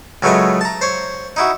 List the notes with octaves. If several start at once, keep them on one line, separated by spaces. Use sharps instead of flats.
C#2 F#3 A3 B4 C#5 D#5
A5 A#5
C5 C#5
D#4 E4 F#4